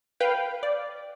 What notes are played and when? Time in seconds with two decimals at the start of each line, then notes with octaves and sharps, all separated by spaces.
0.20 B4 F5 G5
0.63 D5